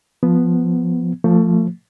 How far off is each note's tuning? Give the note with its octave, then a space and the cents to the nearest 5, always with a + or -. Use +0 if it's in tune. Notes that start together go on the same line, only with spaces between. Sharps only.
F3 +0 B3 +0
F3 +0 A3 +30